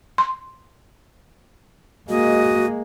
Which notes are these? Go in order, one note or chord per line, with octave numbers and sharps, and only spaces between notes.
C6
G#3 A#3 F#4 D#5